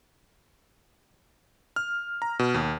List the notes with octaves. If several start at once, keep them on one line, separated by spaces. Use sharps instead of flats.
F6
A#5
B2
D#2